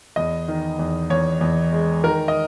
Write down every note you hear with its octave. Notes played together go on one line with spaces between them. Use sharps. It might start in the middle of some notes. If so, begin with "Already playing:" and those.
E2 D#5
D#3
E2
E2 C#5
E2
G#3
D#3 A#4
D#5